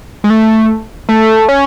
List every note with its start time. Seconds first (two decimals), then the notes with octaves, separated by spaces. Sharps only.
0.24 G#3
0.30 A3
1.09 A3
1.49 C#4